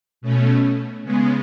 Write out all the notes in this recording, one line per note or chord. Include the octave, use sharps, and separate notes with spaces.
B2 A3 C#4
C#3 G#3 B3